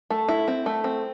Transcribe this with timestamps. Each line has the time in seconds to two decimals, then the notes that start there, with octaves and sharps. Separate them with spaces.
0.10 A3
0.28 E4
0.48 C4
0.66 A3
0.84 C4